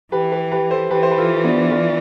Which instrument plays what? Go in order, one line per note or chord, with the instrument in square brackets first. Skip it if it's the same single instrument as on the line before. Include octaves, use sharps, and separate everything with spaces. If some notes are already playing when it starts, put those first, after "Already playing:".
[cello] E3 [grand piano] G4 B4
[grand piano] G4 B4
G4 B4
A4 C5
[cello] E3 [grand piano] G4 B4
[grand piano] C5
B4
F4 A4
B3 D4
D4 F4